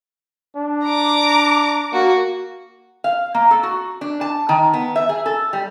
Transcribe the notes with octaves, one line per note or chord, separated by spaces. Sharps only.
D4
A#5 D6
A#3 F#4
F5
A#3
A4
F#4
D4
A5
D#3
B3
E5
G#4
A4
G3